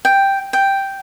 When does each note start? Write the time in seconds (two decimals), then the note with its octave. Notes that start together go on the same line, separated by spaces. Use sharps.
0.05 G5
0.53 G5